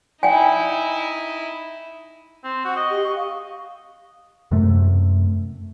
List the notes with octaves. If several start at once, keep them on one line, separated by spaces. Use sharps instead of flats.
D#4 E4 G5 G#5
C4
F#4 C#6
D#5
G4
C#6
F5
F#2 C3 A3